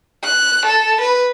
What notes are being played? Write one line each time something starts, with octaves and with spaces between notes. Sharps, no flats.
F#6
A4
B4